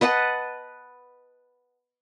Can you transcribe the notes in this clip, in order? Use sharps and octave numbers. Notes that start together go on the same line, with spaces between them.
B4 D#5 F#5 A5